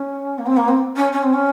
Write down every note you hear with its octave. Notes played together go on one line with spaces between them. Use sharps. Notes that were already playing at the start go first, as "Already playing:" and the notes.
Already playing: C#4
A#3
C4
A#3
C4
C#4
C#4
C4
C#4